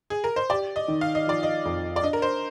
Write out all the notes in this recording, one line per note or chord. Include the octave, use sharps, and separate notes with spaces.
G#4
A#4
C5
G4 D5
D#5
D#3
F5
D#5
F3 D5
D#5
F2
D5
D4 D#5
A#4
C5